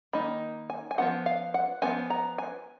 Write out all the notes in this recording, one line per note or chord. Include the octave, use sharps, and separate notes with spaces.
D#3 A#3 D#4 B5
G#5
G#5
F3 B3 D#4 F#5
F5
F#5
F3 B3 D#4 G#5
A#5
G#5